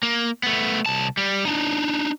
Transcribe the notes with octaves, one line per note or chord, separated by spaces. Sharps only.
A#3
A3 B3
C2 A5
G3
D4 D#4